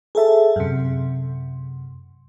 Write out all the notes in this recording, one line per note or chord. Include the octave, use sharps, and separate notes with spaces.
G#4 A4 E5 A5
F#2 C3